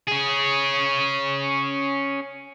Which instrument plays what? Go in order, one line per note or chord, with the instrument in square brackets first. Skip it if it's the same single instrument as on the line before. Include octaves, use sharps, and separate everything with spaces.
[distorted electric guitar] C#4 G#4